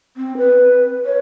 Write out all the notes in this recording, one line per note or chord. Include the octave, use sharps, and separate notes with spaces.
C4
B4
C#5